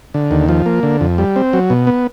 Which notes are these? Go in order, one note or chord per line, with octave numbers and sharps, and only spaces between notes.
D3
D#2
F3
A#3
D3
F2
G3
C4
F#3
B2
B3